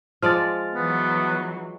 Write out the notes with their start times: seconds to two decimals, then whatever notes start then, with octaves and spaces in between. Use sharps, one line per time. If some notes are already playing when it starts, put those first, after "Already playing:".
0.23 F3 G#3 D5 F6 A6
0.75 E3 F#3 B3